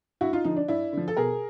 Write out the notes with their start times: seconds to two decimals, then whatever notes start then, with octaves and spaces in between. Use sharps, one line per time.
0.21 G2 E4 F#4
0.33 D#4 F4
0.44 D3 F3 D#4
0.56 D4
0.68 G2 D4 E4
0.93 D3 F3
1.08 A4
1.17 B2 G#4 A#4